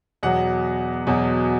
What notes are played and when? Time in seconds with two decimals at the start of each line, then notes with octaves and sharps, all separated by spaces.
0.23 E2 B2 F#3 F#5
1.07 E2 B2 F#3